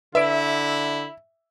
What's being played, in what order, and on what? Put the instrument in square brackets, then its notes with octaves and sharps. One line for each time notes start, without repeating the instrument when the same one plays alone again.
[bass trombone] D3 [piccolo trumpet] E4 [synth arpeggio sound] B4 D5 D7 [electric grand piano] E5